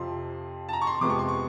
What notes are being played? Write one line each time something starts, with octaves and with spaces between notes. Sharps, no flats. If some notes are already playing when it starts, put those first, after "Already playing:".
Already playing: F2 C3 F3 C6
A5
A#5
C#6
C6
F2 C3 F3 G#3 B3 D6
C#6
C6
C#6